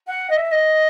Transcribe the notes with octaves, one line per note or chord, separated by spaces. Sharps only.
F#5
D#5
E5
D#5